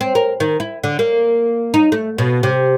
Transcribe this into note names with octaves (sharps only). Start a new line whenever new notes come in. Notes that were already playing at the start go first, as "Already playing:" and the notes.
C4
A#4
D#3
E4
D3
A#3
D#4
A3
B2
C3